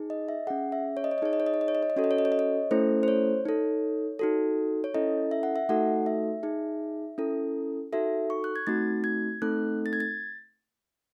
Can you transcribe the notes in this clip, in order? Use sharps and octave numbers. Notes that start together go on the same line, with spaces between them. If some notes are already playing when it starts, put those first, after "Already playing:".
Already playing: D#4 G#4
D#5
E5
C#4 G#4 F#5
E5
C#5
D#5
C#5
D#5
D#4 G#4 C#5
D#5
C#5
D#5
C#5
D#5
C#5
D#5
C#5
D#5
C#4 F#4 A4 C#5
D#5
C#5
D#5
C#5
D#5
C#5
A3 C#4 E4 A4 C5
C5
C#5
D#4 A4
D#4 F#4 A4
C#5
C#4 E4 A4 D#5
E5
F#5
E5
A3 D#4 F#4 A4 F#5
E5
D#4 G#4
C#4 E4 A4
D#4 F#4 A4 E5
C#6
F#6
G#6
A3 C4 D#4 F#4 A6
G#6
A3 C4 D#4 A4 F#6
A6
G#6
A6